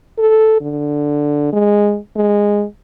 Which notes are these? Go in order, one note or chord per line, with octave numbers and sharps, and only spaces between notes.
A4
D3
G#3
G#3